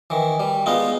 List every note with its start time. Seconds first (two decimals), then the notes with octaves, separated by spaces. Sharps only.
0.10 D#3 E3
0.40 G3
0.66 G#3 B3 D#4 F4